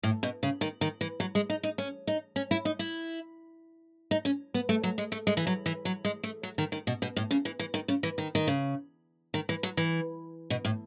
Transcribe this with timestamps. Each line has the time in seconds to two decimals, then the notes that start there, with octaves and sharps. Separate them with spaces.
0.03 A2
0.23 B2
0.43 C#3
0.61 D#3
0.81 D#3
1.01 E3
1.20 F#3
1.35 G#3
1.50 D#4
1.63 D#4
1.78 C#4
2.07 D#4
2.36 C#4
2.51 E4
2.65 D#4
2.79 E4
4.11 D#4
4.25 C#4
4.54 B3
4.69 A3
4.83 F#3
4.98 G#3
5.12 A3
5.27 G#3
5.37 E3
5.47 F#3
5.66 E3
5.85 F#3
6.05 G#3
6.23 A3
6.43 F#3
6.58 D#3
6.72 D#3
6.87 B2
7.02 B2
7.16 A2
7.31 C#3
7.45 E3
7.59 E3
7.74 D#3
7.88 C#3
8.03 E3
8.18 D#3
8.35 D#3
8.47 C#3
9.34 D#3
9.49 E3
9.63 F#3
9.77 E3
10.50 B2
10.65 A2